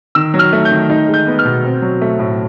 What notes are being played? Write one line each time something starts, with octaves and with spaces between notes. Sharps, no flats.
D#3 E6
F#3
F6
A3
G6
D#3
D#4
G#3
G6
B3
F6
B2
C4
F#3
A3
A2